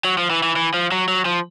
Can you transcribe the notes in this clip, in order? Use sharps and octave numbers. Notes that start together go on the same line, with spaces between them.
F#3
F3
E3
E3
E3
F3
F#3
F#3
F3